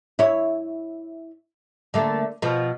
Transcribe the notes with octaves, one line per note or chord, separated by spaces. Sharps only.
E4 C#5
D3 A3 A#3
B2 F3